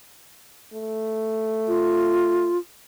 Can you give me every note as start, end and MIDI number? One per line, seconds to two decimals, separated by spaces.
0.73 2.53 57
1.68 2.58 65